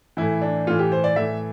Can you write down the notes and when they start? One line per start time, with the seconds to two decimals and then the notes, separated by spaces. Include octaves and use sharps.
0.17 A2 E3 E4
0.42 D4
0.67 A2 E3 F4
0.79 G4
0.92 C5
1.04 D5
1.16 A2 E3 E5